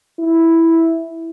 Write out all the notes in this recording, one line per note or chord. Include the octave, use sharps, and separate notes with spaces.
E4